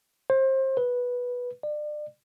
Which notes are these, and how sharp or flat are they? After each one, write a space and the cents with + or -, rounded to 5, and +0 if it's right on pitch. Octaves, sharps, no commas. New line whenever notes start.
C5 +25
B4 -10
D5 +30